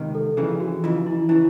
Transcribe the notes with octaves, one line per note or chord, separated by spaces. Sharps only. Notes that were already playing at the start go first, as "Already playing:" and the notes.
Already playing: C#2 C3 D#3
A4
F2 C#3 E3 G#4
F#4
F2 C#3 E3 F4
E4
C#3 E3 E4